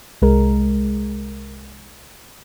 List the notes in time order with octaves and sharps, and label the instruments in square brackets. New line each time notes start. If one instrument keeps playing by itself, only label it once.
[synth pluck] C2 G#3 A#4